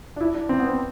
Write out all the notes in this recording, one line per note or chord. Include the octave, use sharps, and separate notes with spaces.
D4
E4
D4
C4
B3
C4